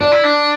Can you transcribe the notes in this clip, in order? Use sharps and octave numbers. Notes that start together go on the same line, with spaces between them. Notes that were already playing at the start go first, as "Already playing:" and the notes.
D4 D5
E4
D4